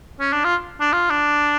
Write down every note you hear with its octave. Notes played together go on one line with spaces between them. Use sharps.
C#4
D4
F4
D4
F4
D4